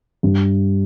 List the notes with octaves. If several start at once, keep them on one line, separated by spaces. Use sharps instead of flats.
G2